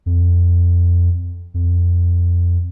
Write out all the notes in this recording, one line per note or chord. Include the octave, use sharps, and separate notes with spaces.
F2
F2